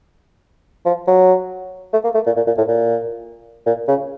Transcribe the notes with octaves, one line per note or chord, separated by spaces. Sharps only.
F3
F#3
A3
A#3
A3
A#2
A#2
A#2
A2
A#2
A#2
C#3